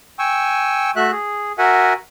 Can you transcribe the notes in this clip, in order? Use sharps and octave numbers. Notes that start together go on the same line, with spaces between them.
G5 G#5 C#6 E6
A3 F#4 E5 F#6
G#4
F#4 A#4 E5 F#5 G#5